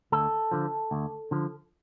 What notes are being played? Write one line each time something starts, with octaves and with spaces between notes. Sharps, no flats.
D2 A4
D3 F3
D2
D3 F3